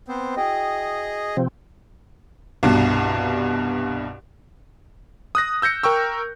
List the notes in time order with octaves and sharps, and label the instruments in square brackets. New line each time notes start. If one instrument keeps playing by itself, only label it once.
[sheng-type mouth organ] B3 C4 C5
[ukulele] E4 F#4 G5 [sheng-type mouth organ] G#4 D#5
[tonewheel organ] C3 F3 C4
[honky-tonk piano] C2 G2 B2
[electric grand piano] D#6 F#6 A#6
E6 G6 A#6 C#7
A#4 G5 C#6 E6